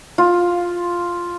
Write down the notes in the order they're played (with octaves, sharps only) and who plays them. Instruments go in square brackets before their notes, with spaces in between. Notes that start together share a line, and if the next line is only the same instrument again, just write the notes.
[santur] F4